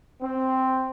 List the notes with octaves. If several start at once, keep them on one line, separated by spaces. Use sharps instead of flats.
C4